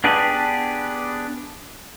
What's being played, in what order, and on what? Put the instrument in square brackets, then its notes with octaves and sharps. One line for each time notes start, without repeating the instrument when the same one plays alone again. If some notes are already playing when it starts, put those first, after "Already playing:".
[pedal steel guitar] B3 D4 G4 G#4 B4